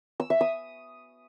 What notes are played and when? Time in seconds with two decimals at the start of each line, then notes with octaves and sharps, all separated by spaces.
0.20 E6
0.30 E5
0.41 D#6